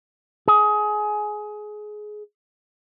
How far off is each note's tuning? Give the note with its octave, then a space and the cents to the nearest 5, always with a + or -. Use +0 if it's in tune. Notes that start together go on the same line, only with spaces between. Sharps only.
G#4 +20